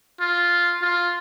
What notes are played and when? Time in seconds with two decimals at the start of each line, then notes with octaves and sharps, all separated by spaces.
0.20 F4
0.82 F4